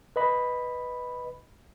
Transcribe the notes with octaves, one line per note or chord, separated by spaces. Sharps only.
B4 D#5 B5